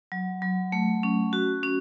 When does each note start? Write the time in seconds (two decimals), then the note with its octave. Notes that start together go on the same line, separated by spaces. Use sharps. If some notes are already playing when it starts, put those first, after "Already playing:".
0.12 F#3
0.42 F#3
0.72 A3
1.03 C#4
1.33 F#4
1.63 C#4